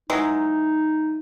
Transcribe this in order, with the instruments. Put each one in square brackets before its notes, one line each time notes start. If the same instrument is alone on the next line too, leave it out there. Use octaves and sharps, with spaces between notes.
[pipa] E3 F#3 G#3 [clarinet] D#4